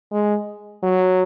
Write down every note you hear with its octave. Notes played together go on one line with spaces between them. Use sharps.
G#3
F#3